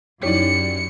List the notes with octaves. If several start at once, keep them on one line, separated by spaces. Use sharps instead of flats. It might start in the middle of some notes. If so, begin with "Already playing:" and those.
F#2 D#4 E4 G4 C#5 D5 C#7